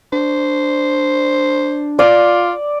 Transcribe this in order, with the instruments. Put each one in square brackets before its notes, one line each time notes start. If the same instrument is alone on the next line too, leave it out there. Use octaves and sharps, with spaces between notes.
[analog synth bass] D4 [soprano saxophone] C5
[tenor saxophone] F4 [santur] D5